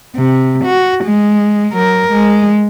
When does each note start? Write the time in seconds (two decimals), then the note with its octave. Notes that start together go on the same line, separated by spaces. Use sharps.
0.16 C3
0.65 F#4
1.05 G#3
1.73 F#3 A#4
2.11 G#3